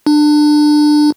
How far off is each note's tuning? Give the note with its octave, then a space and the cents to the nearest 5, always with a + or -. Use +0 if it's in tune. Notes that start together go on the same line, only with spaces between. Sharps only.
D4 +25